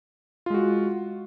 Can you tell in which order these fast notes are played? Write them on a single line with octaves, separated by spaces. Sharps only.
F4 G#3 F#4